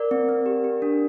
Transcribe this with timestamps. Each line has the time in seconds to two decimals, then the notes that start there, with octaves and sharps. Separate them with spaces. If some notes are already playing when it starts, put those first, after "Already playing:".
Already playing: A#4 D5
0.11 C4
0.29 C4
0.46 G4
0.64 G4
0.82 D4